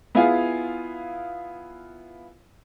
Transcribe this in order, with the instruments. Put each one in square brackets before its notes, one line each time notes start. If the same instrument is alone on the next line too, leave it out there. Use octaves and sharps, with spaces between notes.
[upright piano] B3 E4 F4 G#4 F5 G#5